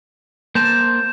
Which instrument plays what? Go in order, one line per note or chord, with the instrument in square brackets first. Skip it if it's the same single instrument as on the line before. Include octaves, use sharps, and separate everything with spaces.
[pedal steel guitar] A#3 C5 A5 [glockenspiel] G6 E7